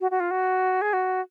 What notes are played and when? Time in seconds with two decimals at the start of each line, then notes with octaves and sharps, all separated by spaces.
0.01 F#4
0.11 F#4
0.20 F4
0.31 F#4
0.82 G#4
0.93 F#4